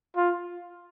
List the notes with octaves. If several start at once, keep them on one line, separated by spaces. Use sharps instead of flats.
F4